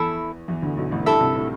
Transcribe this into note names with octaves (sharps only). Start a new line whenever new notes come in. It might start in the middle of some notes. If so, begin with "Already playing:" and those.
Already playing: E2 E3 E4 A4 E5 B5
E2 E3
D2 D3
B1 B2
A1 A2
G2 E4 A4 E5
C2 C3
A2